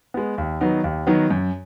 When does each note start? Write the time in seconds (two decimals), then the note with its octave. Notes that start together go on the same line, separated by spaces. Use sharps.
0.14 G#3 B3
0.38 D#2
0.61 D#3 F#3 B3 D#4
0.84 D#2
1.07 D#3 F#3 B3 D#4
1.30 F#2